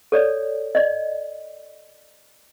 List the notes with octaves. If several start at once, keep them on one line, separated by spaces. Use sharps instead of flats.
A4 C#5 D5
D5 D#5